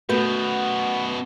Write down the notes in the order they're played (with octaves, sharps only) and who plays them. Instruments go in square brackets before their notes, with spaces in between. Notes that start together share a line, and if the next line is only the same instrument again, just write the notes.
[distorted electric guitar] F#2 B2 [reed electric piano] A3 F#4 G6 [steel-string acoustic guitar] B3